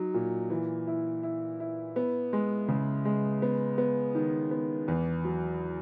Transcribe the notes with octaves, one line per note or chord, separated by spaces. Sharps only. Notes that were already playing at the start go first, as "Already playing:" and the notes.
Already playing: F#3 D#4
A#2
E3
E4
E4
E4
B3
G#3
C#3
G#3
B3
B3
D#3
B3
E2
F#3